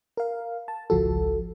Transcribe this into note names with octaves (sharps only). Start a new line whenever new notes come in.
A#4 F5
A5
G#1 C#2 F3 F#4 A4